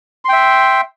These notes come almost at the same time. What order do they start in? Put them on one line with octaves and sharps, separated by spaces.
C6 G5 E5